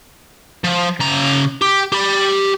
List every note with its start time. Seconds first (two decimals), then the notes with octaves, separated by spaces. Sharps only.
0.64 F3
1.00 C#3 A#5
1.62 G4
1.92 G4 B5